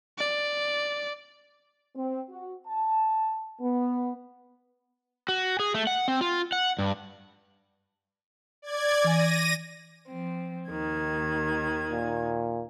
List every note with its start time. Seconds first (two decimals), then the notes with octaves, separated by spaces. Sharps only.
0.18 D5
1.95 C4
2.30 F#4
2.66 A5
3.60 B3
5.28 F#4
5.60 G#4
5.74 A3
5.87 F#5
6.08 C4
6.21 F4
6.52 F#5
6.79 G2
8.62 D5 G#6
9.04 E3 G#5 A#6 D#7
10.07 F3 C4
10.69 D#2 D#3 G#6
11.92 A#2